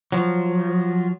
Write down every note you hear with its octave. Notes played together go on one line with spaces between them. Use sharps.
F3 F#3